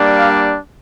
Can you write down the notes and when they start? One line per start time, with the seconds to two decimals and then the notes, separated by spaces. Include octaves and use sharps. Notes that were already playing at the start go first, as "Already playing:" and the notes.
Already playing: G3 A#3 D4
0.19 F5